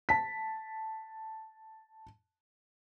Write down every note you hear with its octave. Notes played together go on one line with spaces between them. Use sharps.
A5 B6